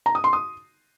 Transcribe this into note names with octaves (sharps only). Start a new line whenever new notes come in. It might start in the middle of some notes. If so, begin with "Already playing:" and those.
A#5
D#6
C6
D#6